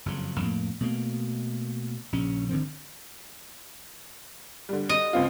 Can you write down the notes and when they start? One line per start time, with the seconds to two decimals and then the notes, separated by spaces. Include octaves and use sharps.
0.06 F#1 F2 C#3
0.40 F2 A2 A#3
0.80 B2 A3 A#3
2.12 A#1 C#3 C#4
2.49 G#1 D3 D#3 C4
4.69 D3 G3
4.89 D#5
5.13 C#2 C4 F4